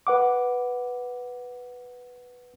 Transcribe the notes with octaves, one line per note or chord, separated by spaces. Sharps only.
B4 F#5 D6